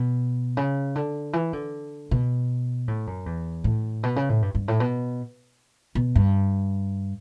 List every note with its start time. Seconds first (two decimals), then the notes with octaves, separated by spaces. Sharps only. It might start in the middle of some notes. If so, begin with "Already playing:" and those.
Already playing: B2
0.57 C#3
0.95 D3
1.33 E3
1.53 D3
2.11 B2
2.88 A2
3.07 F#2
3.26 E2
3.64 A2
4.03 B2
4.16 C#3
4.29 A2
4.42 G2
4.55 G2
4.68 A2
4.80 B2
5.95 B2
6.15 G2